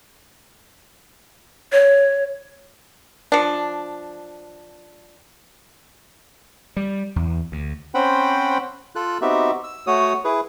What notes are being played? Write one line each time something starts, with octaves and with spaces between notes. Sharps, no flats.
C#5
F3 D4
G3
E2
D2
C4 C#4 C5 F#5 G5 B5
F4 A4 F#6
B3 C4 D#4 F#4 G4 E5
E6
A3 F#4 C#5 D#6
E4 G#4 B4